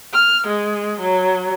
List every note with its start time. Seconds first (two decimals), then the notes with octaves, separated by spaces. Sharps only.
0.12 F6
0.46 G#3
0.99 F#3